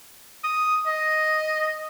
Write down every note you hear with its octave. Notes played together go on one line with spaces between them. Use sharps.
D#6
D#5